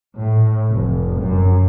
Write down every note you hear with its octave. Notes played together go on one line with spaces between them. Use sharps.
A2
F1
F#2